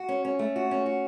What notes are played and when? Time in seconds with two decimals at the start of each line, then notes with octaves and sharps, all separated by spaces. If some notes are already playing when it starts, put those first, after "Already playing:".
Already playing: F#4
0.08 C#4
0.25 C#4
0.39 A3
0.56 F#4
0.71 C#4
0.86 F#4